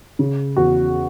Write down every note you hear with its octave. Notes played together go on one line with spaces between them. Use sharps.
C#3
E2 F#4